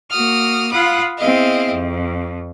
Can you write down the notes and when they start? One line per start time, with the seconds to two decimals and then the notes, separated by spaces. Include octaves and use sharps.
0.10 A#3 F#4 D#6 F6
0.72 F4 F5 F#5 B5 D#6
1.18 B3 C4 E4 G#4 D#5 F5
1.72 F2